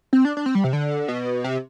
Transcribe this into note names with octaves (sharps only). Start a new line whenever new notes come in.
C4
D4
D4
C4
G3
C3
D3
B2
C3